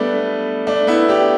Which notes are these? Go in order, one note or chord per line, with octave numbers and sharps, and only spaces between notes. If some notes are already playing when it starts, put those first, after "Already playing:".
Already playing: G3 A3 B3 D4
A3 D4
B3 E4
D4 G4